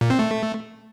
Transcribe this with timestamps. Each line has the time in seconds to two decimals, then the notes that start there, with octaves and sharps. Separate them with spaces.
0.01 A#2
0.10 C4
0.19 A3